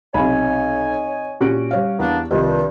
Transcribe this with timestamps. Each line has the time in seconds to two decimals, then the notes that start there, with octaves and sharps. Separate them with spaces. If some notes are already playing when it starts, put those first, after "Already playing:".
0.14 B1 C3 C#5 D#5 G#5 B5
1.40 A#2 C#4 F#4 G4 F#6 D7
1.71 G3 C#5 F5
1.99 E2 A#3 B3 D4
2.31 C2 G2 D#3 F3 D#5